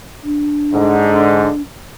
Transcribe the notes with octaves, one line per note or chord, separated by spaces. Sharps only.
D4
G#2 D3